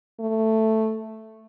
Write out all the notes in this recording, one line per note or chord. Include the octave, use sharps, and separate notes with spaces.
A3